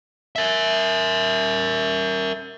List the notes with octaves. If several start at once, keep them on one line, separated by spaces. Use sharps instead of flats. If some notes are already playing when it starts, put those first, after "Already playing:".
A#4 E5